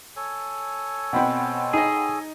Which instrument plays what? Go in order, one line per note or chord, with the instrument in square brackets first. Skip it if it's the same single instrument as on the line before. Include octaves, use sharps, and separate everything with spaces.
[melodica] A4 C#5 G#5
[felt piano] B2 C4 [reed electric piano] F#5 G5 B5
[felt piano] D#4 D#5 [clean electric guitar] G#4